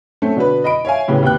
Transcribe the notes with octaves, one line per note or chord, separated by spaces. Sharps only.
A3 C4 C#4
B2 D3 B3 F#4 B4
D#5 B5 D7
C#5 E5 F5 G#5
A2 C#3 B3 G4
D#2 C3 B4 G5 F#6